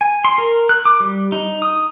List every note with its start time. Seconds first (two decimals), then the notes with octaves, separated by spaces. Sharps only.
0.01 G#5
0.25 C6
0.38 A#4
0.69 F#6
0.85 D6
1.00 G3
1.32 D#4
1.62 D#6